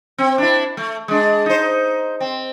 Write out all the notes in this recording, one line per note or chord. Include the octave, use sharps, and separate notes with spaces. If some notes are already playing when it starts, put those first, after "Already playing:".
C4
D4 E4
A3
G#3 D4
D#4 C5
C4